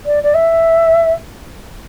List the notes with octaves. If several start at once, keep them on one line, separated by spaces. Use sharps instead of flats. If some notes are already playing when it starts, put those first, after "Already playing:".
D5
D5
E5